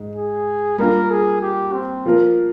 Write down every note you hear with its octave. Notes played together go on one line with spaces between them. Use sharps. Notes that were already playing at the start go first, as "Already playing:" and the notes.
Already playing: G#2 G#3
G#4
G3 A#3 D4 F4 A#4
G#4
G4
C4
F3 A#3 F4 A#4